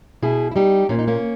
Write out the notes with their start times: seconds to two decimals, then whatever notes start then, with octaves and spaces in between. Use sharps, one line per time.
0.22 B2 E4 G#4
0.51 E4
0.56 G3 D#4 G4
0.89 A#2 C#4
0.99 D#4
1.08 A#3 C#4